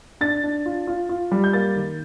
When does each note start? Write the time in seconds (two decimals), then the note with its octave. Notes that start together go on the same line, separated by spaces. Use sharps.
0.21 D4 A6
0.44 D4
0.66 F4
0.87 F4
1.09 F4
1.32 G3
1.44 G6
1.53 A#3 A6
1.76 D#3